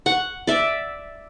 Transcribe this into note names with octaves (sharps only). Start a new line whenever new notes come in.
F#5 C#6
D5 E5